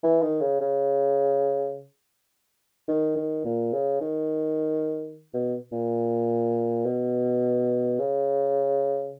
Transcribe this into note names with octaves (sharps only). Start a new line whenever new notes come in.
E3
D#3
C#3
C#3
D#3
D#3
A#2
C#3
D#3
B2
A#2
B2
C#3